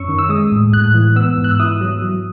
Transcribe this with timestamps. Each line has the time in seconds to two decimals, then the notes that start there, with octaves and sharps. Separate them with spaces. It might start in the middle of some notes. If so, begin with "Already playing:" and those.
Already playing: F#2 C#4 C#6 E6
0.08 D#3
0.19 E6
0.29 G#3 D#6
0.52 A2
0.73 A2 F#6
0.94 E3
1.16 B3 E6
1.38 G#2
1.44 F#6
1.51 E6
1.60 E4 D#6
1.81 F#3
2.02 F#3